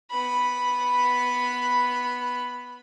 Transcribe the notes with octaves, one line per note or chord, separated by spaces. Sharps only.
B3 B5